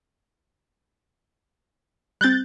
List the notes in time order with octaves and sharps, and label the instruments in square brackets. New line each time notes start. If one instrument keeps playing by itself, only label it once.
[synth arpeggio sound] G3 C4 [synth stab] F#6 G6 A6